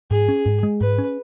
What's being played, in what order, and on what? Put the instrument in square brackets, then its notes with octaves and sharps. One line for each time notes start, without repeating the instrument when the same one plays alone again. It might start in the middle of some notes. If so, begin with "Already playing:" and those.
[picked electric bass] G#2 [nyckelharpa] G#4
[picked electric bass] C#4
G#2
G#3
[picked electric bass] G#2 [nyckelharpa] B4
[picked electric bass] C#4